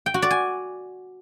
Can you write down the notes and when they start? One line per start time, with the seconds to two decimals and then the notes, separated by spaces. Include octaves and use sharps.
0.06 G5
0.14 F#4
0.22 D5
0.30 G#5